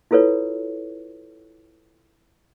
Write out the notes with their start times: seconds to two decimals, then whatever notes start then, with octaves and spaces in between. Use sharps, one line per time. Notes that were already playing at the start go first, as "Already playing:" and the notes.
0.11 E4 F4 A4 B4 C#5